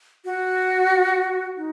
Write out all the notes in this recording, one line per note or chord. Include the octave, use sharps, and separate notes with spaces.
F#4
D#4